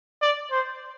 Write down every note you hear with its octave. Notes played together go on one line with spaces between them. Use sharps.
D5
C5